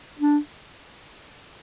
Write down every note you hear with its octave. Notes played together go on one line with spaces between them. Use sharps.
D4